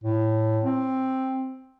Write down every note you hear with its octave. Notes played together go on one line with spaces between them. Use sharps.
A2
C4